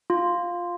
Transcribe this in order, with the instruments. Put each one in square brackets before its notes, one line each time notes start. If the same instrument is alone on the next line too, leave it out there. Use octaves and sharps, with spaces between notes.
[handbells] F4